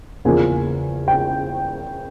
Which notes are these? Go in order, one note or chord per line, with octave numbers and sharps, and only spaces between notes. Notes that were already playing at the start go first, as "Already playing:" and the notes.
E2 C#3 F3 A#3 G#5
G5